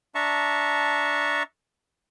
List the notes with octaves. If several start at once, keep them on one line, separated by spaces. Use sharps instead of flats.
D4 E5 A5 A#5 C#6